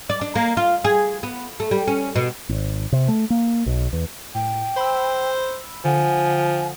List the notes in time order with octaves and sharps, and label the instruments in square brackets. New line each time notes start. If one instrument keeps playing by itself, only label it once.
[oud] D5
D4
A#3
F4
G#4
B3
A3
G3
C#4
B2
[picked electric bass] G#1
C3
A3
A#3
B1
E2
[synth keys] A2 [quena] G5
[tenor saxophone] C5 [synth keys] B5 E6
[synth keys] D3 F#5 [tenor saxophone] F3 [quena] G#5